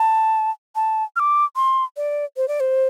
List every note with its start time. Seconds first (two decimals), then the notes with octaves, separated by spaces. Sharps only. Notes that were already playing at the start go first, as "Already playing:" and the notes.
Already playing: A5
0.76 A5
1.16 F6
1.20 D6
1.56 C6
1.97 D5
2.37 C5
2.48 D5
2.60 C5